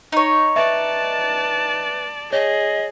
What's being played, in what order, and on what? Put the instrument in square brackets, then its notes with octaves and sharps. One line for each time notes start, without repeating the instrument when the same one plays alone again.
[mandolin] D#4 C#5
[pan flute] B4 [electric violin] D5 A5 [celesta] E5
[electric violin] G#4 [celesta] C#5 [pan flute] D#5